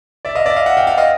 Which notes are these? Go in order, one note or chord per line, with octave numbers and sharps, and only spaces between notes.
D5 E5
D#5 F5
D5 E5
D#5 F5
E5 F#5
F5 G5
F5 G5
D#5 F5